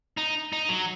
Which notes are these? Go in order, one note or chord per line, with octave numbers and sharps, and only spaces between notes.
D#4
D#4
F#3